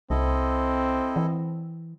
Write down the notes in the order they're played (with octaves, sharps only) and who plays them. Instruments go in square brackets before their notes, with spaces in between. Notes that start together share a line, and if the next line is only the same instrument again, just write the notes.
[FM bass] C2 [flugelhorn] C4 [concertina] E4 A4 D#5
[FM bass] E3